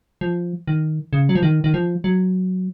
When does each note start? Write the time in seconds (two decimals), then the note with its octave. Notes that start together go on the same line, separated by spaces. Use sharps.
0.21 F3
0.68 D#3
1.13 C#3
1.29 F#3
1.35 F3
1.43 D#3
1.64 D#3
1.74 F3
2.04 F#3